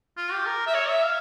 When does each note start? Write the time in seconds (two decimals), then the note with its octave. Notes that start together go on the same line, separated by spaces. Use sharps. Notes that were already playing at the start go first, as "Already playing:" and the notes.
0.17 F4
0.32 G4
0.47 A#4
0.67 E5
0.75 C#5
0.89 E5
1.04 F5